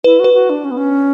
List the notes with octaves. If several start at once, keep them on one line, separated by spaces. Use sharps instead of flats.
E4 B4
F#4 B4
F#4
D4
C#4
B3
C#4